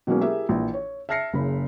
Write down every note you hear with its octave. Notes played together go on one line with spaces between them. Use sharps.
B2 F#3 G#3 A#3 C#4
E4 G4 G#4 A#4 E5
A#1 E3
C#5
E5 A5 F6 A#6 C7 C#7
F#1 C#3 B5